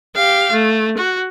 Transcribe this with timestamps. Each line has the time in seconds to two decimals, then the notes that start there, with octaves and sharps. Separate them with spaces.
0.16 G4 F5
0.52 A3
0.97 F#4